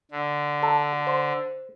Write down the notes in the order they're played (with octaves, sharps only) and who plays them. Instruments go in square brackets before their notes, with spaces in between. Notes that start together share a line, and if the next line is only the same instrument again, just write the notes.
[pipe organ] D3
[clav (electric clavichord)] A4
C5